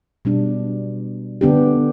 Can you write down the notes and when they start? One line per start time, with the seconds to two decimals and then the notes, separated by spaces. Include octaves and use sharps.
0.25 B2 G3 D4
1.41 D3 B3 D4 G4